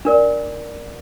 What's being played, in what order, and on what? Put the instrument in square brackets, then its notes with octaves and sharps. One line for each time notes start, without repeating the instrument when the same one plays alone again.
[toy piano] D4 A#4 D5